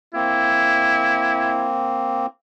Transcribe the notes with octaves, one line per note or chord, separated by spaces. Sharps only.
A#3 C4 E4